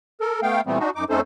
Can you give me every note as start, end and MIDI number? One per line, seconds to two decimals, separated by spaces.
0.21 0.40 69
0.21 0.40 70
0.43 0.61 57
0.43 0.61 59
0.43 0.61 77
0.43 0.61 79
0.66 0.79 46
0.66 0.79 52
0.66 0.79 55
0.66 0.79 57
0.66 0.79 59
0.66 0.79 60
0.79 0.90 62
0.79 0.90 63
0.79 0.90 66
0.95 1.04 42
0.95 1.04 63
0.95 1.04 86
1.10 1.21 41
1.10 1.21 57
1.10 1.21 61
1.10 1.21 63
1.10 1.21 69
1.10 1.21 72